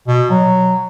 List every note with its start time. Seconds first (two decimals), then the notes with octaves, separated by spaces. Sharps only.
0.08 B2
0.30 F#3